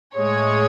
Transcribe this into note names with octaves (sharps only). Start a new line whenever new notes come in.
A2 G#3 C#5